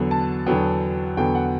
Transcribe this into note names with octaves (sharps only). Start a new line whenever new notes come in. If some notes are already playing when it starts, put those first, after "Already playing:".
Already playing: E2 D3 F#3 B3
A5
E2 D3 F#3 B3 G5
E2 D3 F#3 B3 G5
F#5